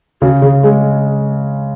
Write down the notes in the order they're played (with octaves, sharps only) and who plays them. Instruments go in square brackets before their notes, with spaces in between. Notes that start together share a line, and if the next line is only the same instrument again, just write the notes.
[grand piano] C#3 [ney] F#4
[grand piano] C#3 [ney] G#4
[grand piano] G#3 [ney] G#4